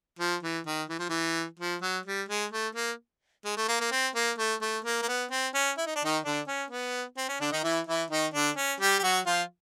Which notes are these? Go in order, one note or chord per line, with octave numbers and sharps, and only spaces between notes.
F3
E3
D#3
E3
F3
E3
F3
F#3
G3
G#3
A3
A#3
G#3
A3
A#3
A#3
C4
A#3
A3
A3
A#3
A#3
B3
C4
C#4
E4
D#4
D4
D#3 D#4
D3 D4
C#4
B3
C4
C#4
D3 D4
D#3 D#4
E3 E4
E3 E4
D#3 D#4
D3 D4
C#4
G3 G4
G4
F#3 F#4
F3 F4